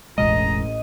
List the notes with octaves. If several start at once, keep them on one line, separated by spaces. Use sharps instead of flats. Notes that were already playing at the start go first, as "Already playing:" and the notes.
E1 A1 B2 G#3 D#5 A#5